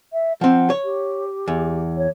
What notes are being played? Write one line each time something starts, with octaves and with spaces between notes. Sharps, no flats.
E5
F3 C4 F#5
C#5
G4
E2
C#5